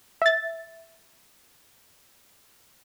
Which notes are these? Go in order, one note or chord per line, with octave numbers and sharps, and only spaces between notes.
E5 A6